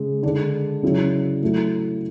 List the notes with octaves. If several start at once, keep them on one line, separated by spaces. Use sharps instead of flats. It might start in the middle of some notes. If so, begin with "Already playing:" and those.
Already playing: C#3 G#3
D3 G#3 D4
C#3 F#3 C#4 E4
A2 F#3 A3 E4